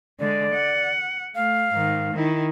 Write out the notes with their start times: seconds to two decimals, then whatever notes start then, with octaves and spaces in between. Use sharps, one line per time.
0.19 D3 G#3 D5
0.54 F#5
1.35 A3 F5
1.73 G#2 D#3
2.13 D#3 E4